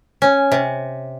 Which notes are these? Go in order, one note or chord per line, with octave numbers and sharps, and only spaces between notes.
C#4
C3